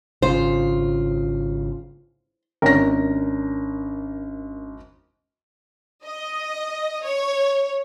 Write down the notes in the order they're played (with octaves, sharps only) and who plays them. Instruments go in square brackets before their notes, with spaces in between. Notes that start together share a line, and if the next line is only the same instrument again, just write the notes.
[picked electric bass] G#1 C#3 [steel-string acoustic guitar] F4 [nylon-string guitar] C5
[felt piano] G#1 A#6 [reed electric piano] C#4 D4 A#4
[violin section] D#5
C#5